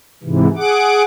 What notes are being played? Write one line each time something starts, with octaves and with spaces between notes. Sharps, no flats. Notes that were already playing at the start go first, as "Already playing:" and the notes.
G#2 C3 E3
G#4 F#5 D6